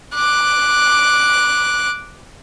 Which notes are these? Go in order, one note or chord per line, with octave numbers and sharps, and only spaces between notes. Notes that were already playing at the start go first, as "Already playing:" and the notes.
D6 F#6